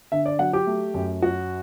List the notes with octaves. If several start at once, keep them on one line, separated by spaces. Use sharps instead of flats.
D3 E5
D5
F#3 F#5
G4
A3
F#2
F#3 F#4